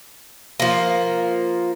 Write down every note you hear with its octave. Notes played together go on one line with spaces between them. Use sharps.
F3 A#3